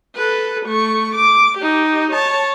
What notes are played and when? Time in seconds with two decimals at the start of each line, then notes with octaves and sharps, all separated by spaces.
0.15 A4 B4
0.66 A3 C#6
1.16 D6
1.58 D#4 G4
2.11 C#5 A5